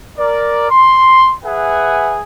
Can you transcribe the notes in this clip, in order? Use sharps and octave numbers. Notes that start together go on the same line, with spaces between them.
A#4 D5
C6
G#4 B4 E5 F#5 G#5